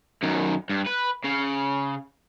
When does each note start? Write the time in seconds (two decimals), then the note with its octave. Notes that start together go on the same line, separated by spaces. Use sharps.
0.23 F#2 D#3
0.69 G2
0.86 B4
1.24 C#3